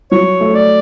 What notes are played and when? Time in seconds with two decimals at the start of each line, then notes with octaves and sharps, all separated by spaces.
0.11 F#3 C#5
0.41 A3
0.54 D5